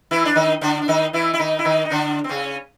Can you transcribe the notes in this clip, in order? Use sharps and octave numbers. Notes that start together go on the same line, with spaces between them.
E3 E4
D4
D#3 D#4
D3 D4
D4
D#3 D#4
E3 E4
E4
D#3 D#4
E4
D#3 D#4
D#4
D3 D4
C4
C#3 C#4